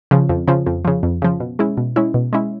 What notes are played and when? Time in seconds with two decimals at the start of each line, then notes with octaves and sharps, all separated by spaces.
0.11 C#3 F3
0.29 F2
0.48 C#3 F3
0.66 F2
0.85 C#3 F3
1.03 F2
1.22 C#3 F3
1.40 B2
1.59 G#3 C#4 E4
1.77 B2
1.96 G#3 C#4 E4
2.14 B2
2.33 G#3 C#4 E4